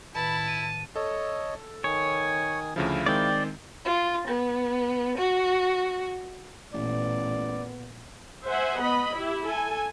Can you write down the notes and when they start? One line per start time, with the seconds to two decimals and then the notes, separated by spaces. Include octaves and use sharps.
0.15 A2 D#3 E4 B4 A5 B5
0.48 D#7
0.96 A4 C#5 D#5
1.84 D#3 C#5 G#5 D#6
2.76 D2 C#3 F3 E4 F5
3.06 D#3 G#3 C4 D5 G5
3.84 F4
4.25 B3
5.17 F#4
6.74 A1 A#2 B3 D5
8.46 C5 E5 F#5 G#5
8.81 B3 D#5 B5
9.15 E4 G4
9.47 A4 G#5